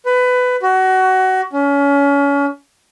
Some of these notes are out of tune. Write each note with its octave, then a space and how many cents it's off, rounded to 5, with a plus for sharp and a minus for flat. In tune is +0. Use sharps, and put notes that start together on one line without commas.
B4 +20
F#4 +25
C#4 +30